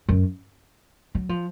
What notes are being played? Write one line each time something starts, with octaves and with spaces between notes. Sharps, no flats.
F#2
F#3
F3